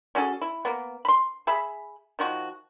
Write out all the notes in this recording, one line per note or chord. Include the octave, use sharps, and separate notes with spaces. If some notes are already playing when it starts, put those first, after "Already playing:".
C#4 F#4 G#4 A4
E4
A#3 B3
B5 C6
G#4 E5 B5
D#3 F3 F#4